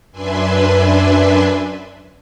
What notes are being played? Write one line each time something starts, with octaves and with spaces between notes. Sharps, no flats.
F#2 D4 B4 E5 G#5 C6